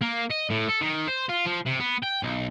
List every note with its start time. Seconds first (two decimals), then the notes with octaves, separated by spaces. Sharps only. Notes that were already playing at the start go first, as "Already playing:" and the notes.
0.01 A#3
0.30 D#5
0.50 A2
0.69 A4
0.81 D#3
1.08 C5
1.29 F4
1.45 F3
1.66 C3
1.80 B3
2.03 G5
2.23 B1